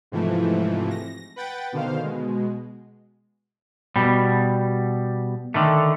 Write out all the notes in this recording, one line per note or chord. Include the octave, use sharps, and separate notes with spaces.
G#2 C3 E3 F3 A3
A#6
B4 F#5 G5 A6
B2 D3 D#3 C5 F5
B2 G#3
B2 G3
D3 D#3 A3